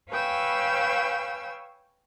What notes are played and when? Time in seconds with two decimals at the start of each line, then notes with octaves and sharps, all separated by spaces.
0.10 B4 C#5 F5 G5 G#5 E6